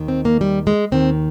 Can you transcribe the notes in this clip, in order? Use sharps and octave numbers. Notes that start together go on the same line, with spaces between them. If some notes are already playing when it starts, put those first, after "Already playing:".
Already playing: D#2 D#3
C4
A#3
G3
G#3
D#2 D#3 C4